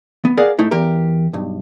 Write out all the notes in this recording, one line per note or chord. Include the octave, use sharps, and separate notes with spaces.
B3
G#4 A#4 D5 F5 F#5
G#2 A3 D#4 E4
E2 G4 A#4
B1 G2